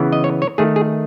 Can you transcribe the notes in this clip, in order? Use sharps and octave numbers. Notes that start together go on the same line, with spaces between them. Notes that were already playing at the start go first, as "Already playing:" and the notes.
Already playing: C#3 E3 B3
D#5
C#5
C#5
D#3 A3 G#4
G#4